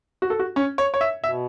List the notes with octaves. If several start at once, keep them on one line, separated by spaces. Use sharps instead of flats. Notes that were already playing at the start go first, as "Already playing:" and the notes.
F#4
A4
F#4
C#4
C#5
C#5
E5
B2 E5